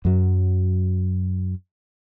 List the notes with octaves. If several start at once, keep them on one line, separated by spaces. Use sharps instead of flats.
F#2 F#3